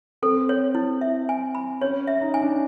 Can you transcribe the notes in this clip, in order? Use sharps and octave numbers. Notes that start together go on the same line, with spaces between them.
C4 A4
C#5
E4
E5
G#5
B5
C#4 C#5
E5
D#4
G#5
D4